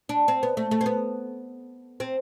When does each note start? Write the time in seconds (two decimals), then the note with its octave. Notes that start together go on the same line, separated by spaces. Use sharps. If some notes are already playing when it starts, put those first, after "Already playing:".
0.09 D4
0.28 C4
0.43 B3
0.57 A3
0.71 A3
0.81 C4
0.86 B3
2.00 C4